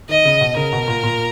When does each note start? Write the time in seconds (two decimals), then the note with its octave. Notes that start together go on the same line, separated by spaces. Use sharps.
0.09 D#3 D#5
0.25 C#3
0.41 B2
0.56 C#3 A#4
0.73 B2
0.88 A#2
1.03 A#2